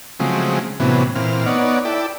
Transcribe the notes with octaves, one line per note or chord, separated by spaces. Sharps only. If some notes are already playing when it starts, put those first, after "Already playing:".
C#3 F3 F#3 G#3 A3 C4
A2 C3 E3 F#3 B3 C#4
A#2 E3 C4 F6
B3 D#4 C#5 D5 F#5
E4 A4 D5 G5